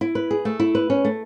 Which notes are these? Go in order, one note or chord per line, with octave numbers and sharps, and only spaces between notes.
E4
B4
G#4
A3
E4
B4
C#4
A3